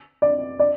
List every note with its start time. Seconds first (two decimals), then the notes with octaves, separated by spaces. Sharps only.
0.22 D5
0.59 D5